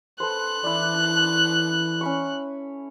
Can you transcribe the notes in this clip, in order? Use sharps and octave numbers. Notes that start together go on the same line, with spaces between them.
A4 B4 C5 F#6
E3 E4 D5
C#4 B5 C#6